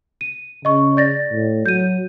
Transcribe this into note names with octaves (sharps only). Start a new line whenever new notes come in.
D#7
C#3 D#5 C#6
D5 A6 A#6
A2
F#3 G6 D#7